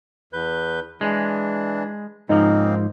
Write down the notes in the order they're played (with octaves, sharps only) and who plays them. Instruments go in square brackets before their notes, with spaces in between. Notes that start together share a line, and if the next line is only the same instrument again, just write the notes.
[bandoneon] E2 B4 G6
[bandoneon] E3 D4 [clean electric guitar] G#3
[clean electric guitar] G#2 F3 [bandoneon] C#3 A#3 C4 [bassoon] D#4